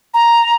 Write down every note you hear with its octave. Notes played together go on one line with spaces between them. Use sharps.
A#5